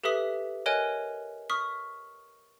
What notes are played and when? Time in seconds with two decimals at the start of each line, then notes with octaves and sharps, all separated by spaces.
0.03 G4 A4 B4 E5 D#6 B6
0.66 A#4 C#5 D#5 G#5 F#6 D7
1.50 C#6 D#6 F6 B6